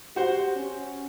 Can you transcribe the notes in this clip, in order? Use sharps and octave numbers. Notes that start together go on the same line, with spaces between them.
F#4 G4 C5
C#4